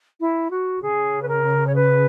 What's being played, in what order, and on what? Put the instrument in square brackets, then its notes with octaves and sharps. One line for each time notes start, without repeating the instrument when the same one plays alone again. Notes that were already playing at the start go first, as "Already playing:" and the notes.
[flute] E4
F#4
[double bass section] C#3 [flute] G#4
[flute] B4
A#4
C#5
B4